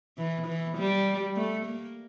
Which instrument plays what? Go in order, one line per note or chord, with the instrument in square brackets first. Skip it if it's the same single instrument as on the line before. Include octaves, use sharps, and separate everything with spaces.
[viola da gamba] E3
E3
G3
A3
A#3